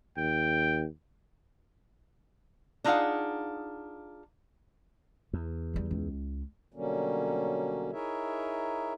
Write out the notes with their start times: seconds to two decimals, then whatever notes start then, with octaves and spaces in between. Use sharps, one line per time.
0.17 D#2 G5
2.84 D4 D#4 F4 G#4 F5 F#5
5.33 E2
5.74 C#3 G3
5.91 C#2
6.74 B2 D3 F#3 G3 A#3 C#4
7.92 D#4 E4 G#4 A#4 C#5 E5